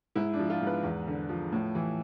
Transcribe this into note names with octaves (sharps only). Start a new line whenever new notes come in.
G#2 E4
D4
F3
F4
G#2 B4
E2
D3
F3
A2
E3